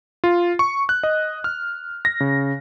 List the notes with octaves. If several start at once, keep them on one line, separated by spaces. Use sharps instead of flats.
F4
C#6
F#6
D#5
F6
A#6
C#3